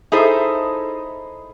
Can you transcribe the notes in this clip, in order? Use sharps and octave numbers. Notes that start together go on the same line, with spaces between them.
D#4 E4 G#4 A4 C5